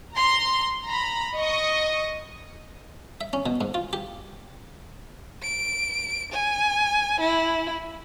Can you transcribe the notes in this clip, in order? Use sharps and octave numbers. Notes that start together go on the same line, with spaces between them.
A#5 C6
A#5 B5
D#5 C#6 D#6
E5
C#4
B2
G#2
F4
G4
D7
G#5
E4